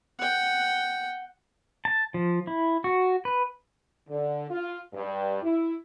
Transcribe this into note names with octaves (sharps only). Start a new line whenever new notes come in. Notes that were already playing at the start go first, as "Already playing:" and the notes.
F#5 G5
A5
F3
E4
F#4
B4
D3
F4
G2
E4